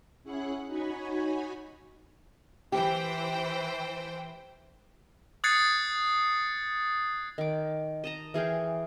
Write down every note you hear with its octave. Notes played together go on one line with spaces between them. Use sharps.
C#4 E4 G#4 F#5 F#6
D#4 F#4 C#5 G#5 B5
E3 G4 C5 G5
D#6 F#6 G#6 A6 C7 C#7
D#3 D6
D#5 A5 A#5
E3 G#4 F5 G5